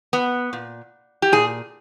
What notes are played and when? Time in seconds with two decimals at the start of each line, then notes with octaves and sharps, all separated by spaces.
0.13 B3
0.53 A#2
1.22 G4
1.32 A#2 G#4